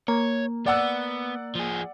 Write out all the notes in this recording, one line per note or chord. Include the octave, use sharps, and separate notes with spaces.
A#3 C#5
B3 D5 F#5 E6
F3 G#4